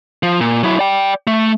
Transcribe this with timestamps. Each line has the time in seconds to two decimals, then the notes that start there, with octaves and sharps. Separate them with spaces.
0.23 F3
0.41 A#2
0.63 F#3 E4
0.79 D5 G5
1.27 A3